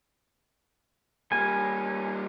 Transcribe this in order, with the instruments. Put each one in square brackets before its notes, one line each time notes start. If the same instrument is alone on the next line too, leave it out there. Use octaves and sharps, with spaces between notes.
[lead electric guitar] G3 A#3 [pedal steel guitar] G#5